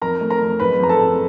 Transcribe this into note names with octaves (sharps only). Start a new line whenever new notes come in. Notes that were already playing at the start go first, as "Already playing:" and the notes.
F2 A#4 A#5
A3
A#4 A#5
F2
F#1 B4 B5
F2 A#5
A4 A5
F#1